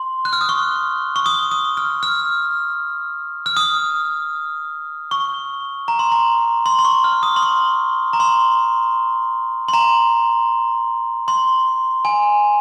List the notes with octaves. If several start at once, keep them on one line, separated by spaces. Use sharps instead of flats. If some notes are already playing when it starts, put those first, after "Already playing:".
Already playing: C6
F#6
F6
D#6
C#6
C#6
D#6
D#6
F6
F6
F6
D#6
C#6
A#5
C6
A#5
C6
C6
C#6
F6
D#6
C6
C#6
A#5
C6
C6
A#5
C6
G#5